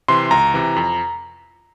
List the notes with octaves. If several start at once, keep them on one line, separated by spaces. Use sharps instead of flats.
C3 E3 C6
C#2 A#5
C3 E3
F2